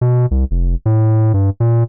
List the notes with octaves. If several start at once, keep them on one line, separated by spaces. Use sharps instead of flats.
B2
C2
F1
A2
G2
A#2